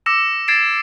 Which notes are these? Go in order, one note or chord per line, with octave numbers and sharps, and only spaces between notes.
D6 E6 A#6 C#7 E7
G#6 A6 C7 D7 E7